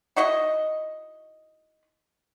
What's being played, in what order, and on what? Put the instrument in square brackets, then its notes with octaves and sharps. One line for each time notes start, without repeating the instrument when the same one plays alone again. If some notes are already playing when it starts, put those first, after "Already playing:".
[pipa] D#4 E4 F#4 D#5